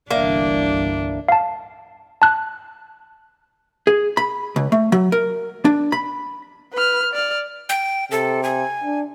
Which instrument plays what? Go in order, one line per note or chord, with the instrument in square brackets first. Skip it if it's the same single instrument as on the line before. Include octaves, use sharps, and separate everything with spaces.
[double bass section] G1 C2 E3 [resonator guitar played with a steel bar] A#3 [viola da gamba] D4 [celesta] D5 E5
[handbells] F5 A5
A5 F#6
[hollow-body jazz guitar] G#4
B5
C#2
A3
F#3
A#4
D4
B5
[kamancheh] B4 F6
D5 F6
[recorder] G5
[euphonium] C3 [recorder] A4
[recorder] G#5
[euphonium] D4